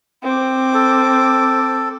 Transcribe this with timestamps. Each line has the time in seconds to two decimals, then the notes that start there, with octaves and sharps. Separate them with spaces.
0.23 C4 D6
0.74 A4